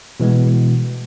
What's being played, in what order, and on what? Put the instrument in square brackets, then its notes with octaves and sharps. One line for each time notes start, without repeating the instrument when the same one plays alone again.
[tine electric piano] B2 E3 G#3 B3